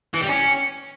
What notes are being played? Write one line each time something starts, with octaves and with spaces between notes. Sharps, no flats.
E3
G3
C#4